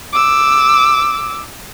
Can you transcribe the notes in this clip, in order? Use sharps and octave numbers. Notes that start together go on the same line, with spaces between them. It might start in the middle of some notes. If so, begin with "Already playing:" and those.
D6 E6